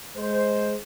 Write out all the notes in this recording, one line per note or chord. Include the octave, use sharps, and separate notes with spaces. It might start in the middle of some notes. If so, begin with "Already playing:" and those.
G#3 C5